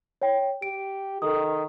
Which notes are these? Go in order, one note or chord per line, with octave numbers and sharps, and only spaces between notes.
C#5 G5
G4 D7
D#3 A4 D#6